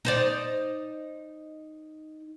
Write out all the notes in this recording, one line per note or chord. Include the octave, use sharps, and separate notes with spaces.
D#4 C5 D5